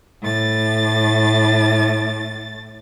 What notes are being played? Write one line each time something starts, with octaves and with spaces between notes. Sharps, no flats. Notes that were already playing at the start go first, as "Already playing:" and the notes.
A2 A6